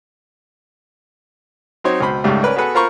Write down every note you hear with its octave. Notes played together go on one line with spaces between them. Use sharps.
F#3 C4 D#4 C5 C#5
C#2 B2 C5 B5
C#2 G#2 C#3 G3 A3
C#4 A#4 B4 D5
B3 F#4 G#4 A4 B4 F#5
F4 A#4 C5 A#5 B5 C#6